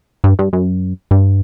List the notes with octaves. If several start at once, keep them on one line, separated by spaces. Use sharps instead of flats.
G2
G2
F#2
G2